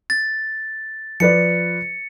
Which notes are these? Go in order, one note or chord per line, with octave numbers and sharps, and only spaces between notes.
A6
F3 B4 D5 C#7